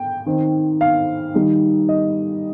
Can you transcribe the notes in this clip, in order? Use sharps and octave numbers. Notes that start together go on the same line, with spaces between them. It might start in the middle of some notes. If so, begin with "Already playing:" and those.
Already playing: G5
D#3 C4 D#4
F5
D#3 G3 D#4
D#5